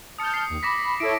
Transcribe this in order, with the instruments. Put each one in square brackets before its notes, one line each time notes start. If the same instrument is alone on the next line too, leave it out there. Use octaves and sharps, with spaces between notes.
[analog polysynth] A5 F6 G6 [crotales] D#6 C#7
[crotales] C7
[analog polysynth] D#2
[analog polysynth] B5 [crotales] D6 A#6 B6
[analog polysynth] E4 A4 C#5 [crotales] D7